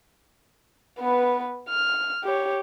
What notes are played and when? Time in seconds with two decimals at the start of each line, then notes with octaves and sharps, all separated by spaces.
0.99 B3 B4
1.69 F6
2.24 G4 C#5